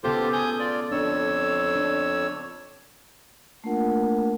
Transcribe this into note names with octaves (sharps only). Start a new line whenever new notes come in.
C#3 B3 F4 G4 A4 C5
G#5 D#6 G6
F4 D5
F2 D4 C#5 E6
D4
A3 A#3 D4 F4 A#4 F#5